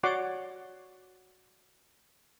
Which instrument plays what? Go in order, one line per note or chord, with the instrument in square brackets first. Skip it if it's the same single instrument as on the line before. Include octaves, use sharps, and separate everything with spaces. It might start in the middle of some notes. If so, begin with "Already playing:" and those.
[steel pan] F#4 C#5 D5 F#5 C6 D6